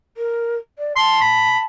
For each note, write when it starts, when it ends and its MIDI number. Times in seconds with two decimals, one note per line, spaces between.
0.17 0.56 70
0.78 0.93 74
0.96 1.64 81
0.96 1.18 84
1.21 1.60 83